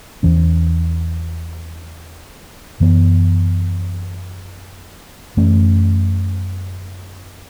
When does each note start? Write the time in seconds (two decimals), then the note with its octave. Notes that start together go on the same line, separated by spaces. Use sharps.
0.23 E2 E3 C#4
2.80 F#2 E3 B3
5.37 F#2 E3 A3 C#4